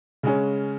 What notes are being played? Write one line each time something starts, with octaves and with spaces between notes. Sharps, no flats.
C#3 G#3 C#4